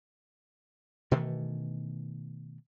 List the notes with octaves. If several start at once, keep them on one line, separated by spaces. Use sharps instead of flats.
B2 D#3 E3 A3